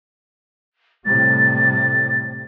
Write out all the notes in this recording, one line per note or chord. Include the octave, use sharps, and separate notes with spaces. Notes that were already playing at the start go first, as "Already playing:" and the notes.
A2 C3 G3 A6